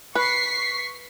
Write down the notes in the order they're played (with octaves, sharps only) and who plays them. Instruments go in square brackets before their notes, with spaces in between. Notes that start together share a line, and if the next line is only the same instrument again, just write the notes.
[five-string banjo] B4 [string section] C#6 B6 C7